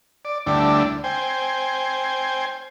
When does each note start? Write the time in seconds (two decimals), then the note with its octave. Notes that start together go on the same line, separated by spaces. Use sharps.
0.25 D5
0.46 D2 D3 G3 A3 D4 E4
1.04 C5 G5 G#5